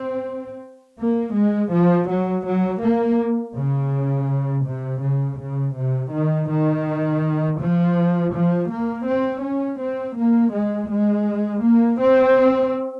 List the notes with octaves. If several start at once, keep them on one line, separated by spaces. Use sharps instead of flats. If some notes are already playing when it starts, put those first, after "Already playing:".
Already playing: C4
A#3
G#3
F3
F#3
F#3
A#3
C#3
C3
C#3
C#3
C3
D#3
D#3
F3
F3
A#3
C4
C#4
C4
A#3
G#3
G#3
A#3
C4